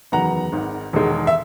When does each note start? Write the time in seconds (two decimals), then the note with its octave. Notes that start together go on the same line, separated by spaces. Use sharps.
0.12 F#1 E2 D#3 F#3 B3 F#5 A#5
0.52 G#1 G#2 D#3
0.93 E1 E2 D#3 G#3
1.27 E5